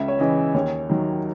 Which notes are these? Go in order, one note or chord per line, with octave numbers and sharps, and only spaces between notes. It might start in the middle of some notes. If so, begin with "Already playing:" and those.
Already playing: C#2 E5
C#5
C#3 E3 D#5
D#2 C#5
D#3 F#3